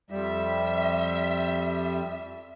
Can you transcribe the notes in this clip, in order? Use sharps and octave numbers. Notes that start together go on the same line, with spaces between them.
F2 G3 E5